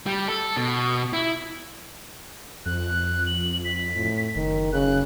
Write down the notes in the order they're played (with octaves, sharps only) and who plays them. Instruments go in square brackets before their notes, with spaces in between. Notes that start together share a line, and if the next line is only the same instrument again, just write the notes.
[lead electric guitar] G3
A4
B2
E4
[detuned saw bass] F2 [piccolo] F#6
[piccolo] F#7
B6
[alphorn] A2
[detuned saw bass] F#1 [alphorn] D#3
[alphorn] C#3 [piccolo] F#6